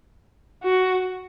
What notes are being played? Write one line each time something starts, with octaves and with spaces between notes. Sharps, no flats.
F#4